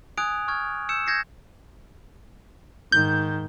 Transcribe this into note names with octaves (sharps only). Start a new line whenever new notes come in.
G#5 D#6 F#6 G#6 D7 F7
C#6 F6 G#6
E6 G6 C#7 E7
G6 G#6 A#6 C7 C#7
G#2 D#3 G6